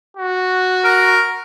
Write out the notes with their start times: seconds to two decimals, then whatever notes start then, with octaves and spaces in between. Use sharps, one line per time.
0.17 F#4
0.84 A#4